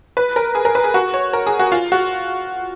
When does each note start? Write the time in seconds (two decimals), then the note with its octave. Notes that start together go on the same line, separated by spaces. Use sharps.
0.17 B4
0.36 A#4
0.55 G#4
0.65 A#4
0.75 B4
0.84 G#4
0.94 F#4
1.14 C#5
1.33 A#4
1.47 G#4
1.59 F#4
1.72 F4
1.92 F#4